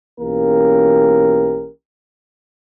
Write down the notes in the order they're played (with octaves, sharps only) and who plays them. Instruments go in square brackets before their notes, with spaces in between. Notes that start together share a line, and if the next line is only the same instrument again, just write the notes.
[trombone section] B1 E3 A#3 C#4 G4 A#4